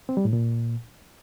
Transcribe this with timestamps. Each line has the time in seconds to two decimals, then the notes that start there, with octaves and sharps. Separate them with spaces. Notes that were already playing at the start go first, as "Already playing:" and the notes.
0.09 C4
0.17 G3
0.25 A2
0.33 A#2